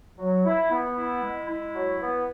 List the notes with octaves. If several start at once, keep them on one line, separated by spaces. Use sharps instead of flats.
F#3
E4
B3
E4
G#3
E4
F#3
B3